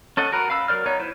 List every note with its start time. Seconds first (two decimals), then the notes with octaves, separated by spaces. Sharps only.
0.17 C#4 A4 D#5 F#5
0.32 F#4 A#4 B4
0.50 F5 B5 E6
0.68 F#3 A#4 C5 D5 F6
0.86 B3 D#4 C#5
0.99 E4 B4 C5